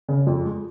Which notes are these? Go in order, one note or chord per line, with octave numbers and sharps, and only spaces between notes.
C#3
F2
G#3